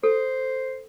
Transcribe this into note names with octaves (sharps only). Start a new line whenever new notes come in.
A4 C5